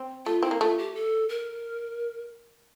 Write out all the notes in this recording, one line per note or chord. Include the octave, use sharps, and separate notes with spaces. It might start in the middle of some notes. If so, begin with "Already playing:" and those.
Already playing: C4
A3 F4
C4 E4
A#3
A3 F4
G4
A4
A#4